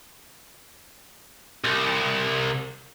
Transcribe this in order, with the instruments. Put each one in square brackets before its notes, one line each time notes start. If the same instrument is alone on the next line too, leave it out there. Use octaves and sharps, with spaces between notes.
[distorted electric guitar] C2